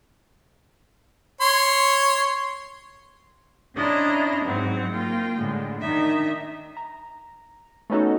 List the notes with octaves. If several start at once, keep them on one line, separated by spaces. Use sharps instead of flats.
C#5 C6
C#4 D4 E4 D#5 A#5 C6
G#2 F#3 C4 F#5
A#3 F4 G5
A2 D3 G#3
D#3 D4 D#4 E5
A#5
A3 B3 C#4 D#4 F#4 A4